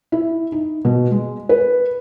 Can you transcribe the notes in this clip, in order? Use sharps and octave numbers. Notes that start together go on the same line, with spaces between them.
E4
D#4
B2
G#3
B4